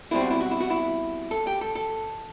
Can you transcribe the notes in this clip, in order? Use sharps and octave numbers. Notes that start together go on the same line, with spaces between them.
B2 G3 C4 E4
F#4
E4
F#4
E4
F#4
E4
A4
G4
A4
A4